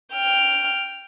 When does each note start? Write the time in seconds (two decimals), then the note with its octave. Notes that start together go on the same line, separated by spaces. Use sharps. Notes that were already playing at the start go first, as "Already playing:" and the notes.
0.13 G5 F6